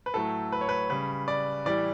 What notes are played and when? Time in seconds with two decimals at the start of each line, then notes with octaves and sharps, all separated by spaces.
0.06 B4
0.14 A2 F#3 A3 A4
0.52 B4
0.61 C#5
0.69 B4
0.90 C#3 G3 B4
1.28 D5
1.65 A2 E3 G3 D5